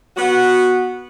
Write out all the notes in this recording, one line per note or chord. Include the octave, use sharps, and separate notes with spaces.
B3 F#4